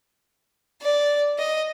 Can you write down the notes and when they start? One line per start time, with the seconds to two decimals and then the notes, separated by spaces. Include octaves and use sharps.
0.82 D5
1.38 D#5